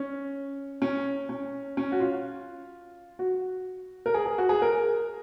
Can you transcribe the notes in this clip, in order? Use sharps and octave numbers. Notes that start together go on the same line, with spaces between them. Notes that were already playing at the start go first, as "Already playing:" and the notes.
Already playing: C#4
C#4
C#4
C#4
F#4
F4
F#4
A#4
G#4
G#4
F#4
G#4
A#4